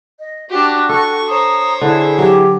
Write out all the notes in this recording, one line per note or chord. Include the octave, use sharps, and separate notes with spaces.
D#5
D4 F#4 G4
A4 C#6
C5 C#5 A#5 D#6
D3 E4 G#4
F#3 G4